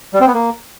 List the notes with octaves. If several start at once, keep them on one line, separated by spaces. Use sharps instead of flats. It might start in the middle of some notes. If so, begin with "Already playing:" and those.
G3
C4
B3
A#3